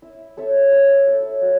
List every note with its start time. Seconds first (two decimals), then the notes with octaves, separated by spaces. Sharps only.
0.02 E4
0.37 A4 C#5 E5
0.72 E4
1.07 A4 C#5 E5
1.41 F#3